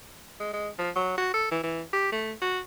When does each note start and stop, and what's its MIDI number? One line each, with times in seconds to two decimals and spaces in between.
0.40 0.52 56
0.53 0.69 56
0.79 0.90 53
0.96 1.17 54
1.17 1.33 66
1.34 1.46 69
1.51 1.60 52
1.63 1.82 52
1.93 2.10 67
2.12 2.32 57
2.41 2.59 66